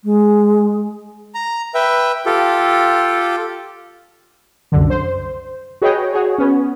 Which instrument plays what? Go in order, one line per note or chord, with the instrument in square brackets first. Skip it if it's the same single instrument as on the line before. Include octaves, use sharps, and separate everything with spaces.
[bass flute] G#3
[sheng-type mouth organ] A#5
B4 E5 G5
F4 G4 A4
[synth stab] C2 F#2 D3
C5
F#4 G#4 B4 C#5 D#5 G5
F#4 G#4 C#5
B3 C#4